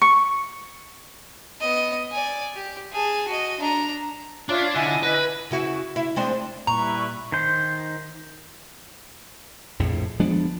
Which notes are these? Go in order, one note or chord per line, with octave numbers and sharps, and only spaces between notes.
C#6
B3 D#5
D5 G#5
G4
G#4 A5
F#4 D#5
D4 A#5
D4 F4 C#5 E5
D3 E4 D#5 G#5
B4
C#3 E4 F#4
E4
G#3 C4 D4
A#2 G3 E4 B4 A#5 C#6
D#3 C5
A#1 F2 A2
F3 G#3 B3 D4